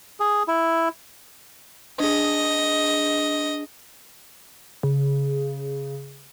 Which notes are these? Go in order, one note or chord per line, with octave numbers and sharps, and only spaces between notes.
G#4
E4
D4 G#4 D#5
C#3